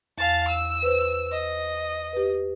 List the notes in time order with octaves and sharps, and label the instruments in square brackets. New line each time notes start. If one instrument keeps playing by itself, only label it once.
[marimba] E2 [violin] F5 A5
[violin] E6
[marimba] B4 C5
[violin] D#5
[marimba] G4 B4